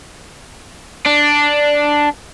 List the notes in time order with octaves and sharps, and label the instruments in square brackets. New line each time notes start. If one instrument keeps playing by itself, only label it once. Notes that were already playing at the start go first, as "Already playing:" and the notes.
[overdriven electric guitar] D4